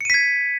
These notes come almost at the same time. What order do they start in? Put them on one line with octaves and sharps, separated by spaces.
C#7 D#7 B6 G#6